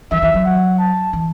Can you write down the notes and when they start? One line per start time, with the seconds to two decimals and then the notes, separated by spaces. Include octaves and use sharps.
0.12 E3 E5
0.22 E3
0.34 F#3
0.45 F#5
0.79 A5
1.13 E3